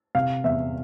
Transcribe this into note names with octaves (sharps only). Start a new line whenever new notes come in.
C3 F5
E2 E5